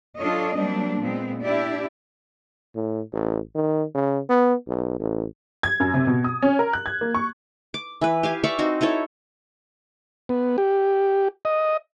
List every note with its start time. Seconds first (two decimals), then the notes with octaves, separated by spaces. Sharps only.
0.18 F#3 D4 F4 A4 C#5 D#5
0.56 F#3 G3 A#3 C4 D4
1.00 A#2 G#3 B3 C4
1.43 D4 E4 G4 D5
2.75 A2
3.12 A1
3.55 D#3
3.94 C#3
4.29 B3
4.67 B1
4.99 A1
5.63 G#6
5.80 F#2
5.94 C3
6.07 B2
6.24 D#6
6.42 C#4
6.59 A#4
6.73 F#6
6.86 G#6
7.01 A#3
7.15 C#6
7.74 D6
8.01 E3 B4
8.23 G4 F5 G#5
8.44 D5 E5 F5 C#6
8.59 C4 D#4 F#4
8.81 D#4 E4 A4 C#5
10.29 B3
10.58 G4
11.45 D#5